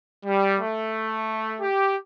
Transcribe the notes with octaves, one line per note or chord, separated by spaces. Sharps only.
G3
A3
G4